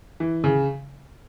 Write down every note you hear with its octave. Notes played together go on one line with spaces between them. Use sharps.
E3
C#3